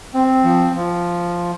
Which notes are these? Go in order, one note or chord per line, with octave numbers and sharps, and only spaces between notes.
C4
F3
F3